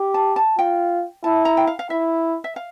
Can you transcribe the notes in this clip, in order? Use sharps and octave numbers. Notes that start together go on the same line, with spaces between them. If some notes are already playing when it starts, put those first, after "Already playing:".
Already playing: G4
A5
A5
F4 G5
E4 A5
A#5
G5
F5
F5
E4 E5
E5
F5